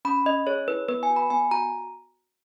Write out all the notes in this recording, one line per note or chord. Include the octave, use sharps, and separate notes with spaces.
C#4 B5
C#4 D#5
G#4 C#5
E4 B4
B3 B4
G#5
F#4
B5
B3 G#5
F#4 A#5